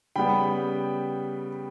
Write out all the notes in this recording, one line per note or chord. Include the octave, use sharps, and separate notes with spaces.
C#3 G3 B3 G5 B5